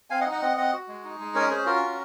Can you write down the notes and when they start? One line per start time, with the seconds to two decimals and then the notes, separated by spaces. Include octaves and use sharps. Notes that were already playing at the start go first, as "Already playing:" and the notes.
0.10 C4 F5 G#5
0.21 D#5 F#5
0.26 D#4
0.31 D#5 F#5
0.41 C4 D#5 F#5
0.57 C4 D#5 F#5
0.73 F#4
0.88 G#3
1.04 D#4
1.20 G#3
1.35 C#4 A#4 C#5
1.50 C#4 G#4 C5
1.66 F4 F#4 A#4
1.82 C#4